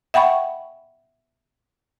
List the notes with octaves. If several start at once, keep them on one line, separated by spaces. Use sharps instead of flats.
E5 F#5 G5 B5 C#6